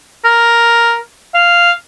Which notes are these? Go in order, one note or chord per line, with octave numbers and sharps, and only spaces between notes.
A#4
F5